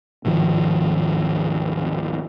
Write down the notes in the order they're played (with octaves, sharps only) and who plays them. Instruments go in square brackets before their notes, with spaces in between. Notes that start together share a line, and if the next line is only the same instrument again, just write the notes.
[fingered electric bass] D1 G#2 D#3 F3